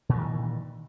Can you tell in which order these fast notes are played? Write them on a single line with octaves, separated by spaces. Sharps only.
A#2 G2 D#3 E3